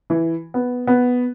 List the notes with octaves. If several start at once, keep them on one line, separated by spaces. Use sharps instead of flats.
E3
B3
B3